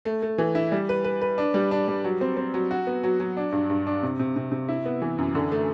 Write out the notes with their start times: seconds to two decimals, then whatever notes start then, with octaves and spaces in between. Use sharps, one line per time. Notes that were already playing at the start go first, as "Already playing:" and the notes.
0.05 A3
0.22 A3
0.38 E3
0.55 E4
0.72 G3
0.89 B4
1.04 B4
1.21 B4
1.38 D4
1.54 G3
1.71 D4
1.88 G3
2.04 F#3
2.21 C4
2.37 C4
2.54 F#3
2.71 F#4
2.87 B3
3.03 F#3
3.20 F#3
3.37 D4
3.52 G2
3.70 G2
3.87 D4
4.03 C3
4.20 C3
4.36 C3
4.52 C3
4.68 E4
4.85 B3
5.02 E3
5.18 F#2
5.35 D3
5.52 A3